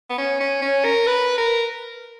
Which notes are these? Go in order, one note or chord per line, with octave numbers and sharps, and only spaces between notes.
B3
C#4
C#4
C#4
A#4
B4
A#4